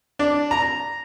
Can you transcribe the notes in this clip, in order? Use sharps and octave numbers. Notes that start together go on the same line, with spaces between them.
D4
A#5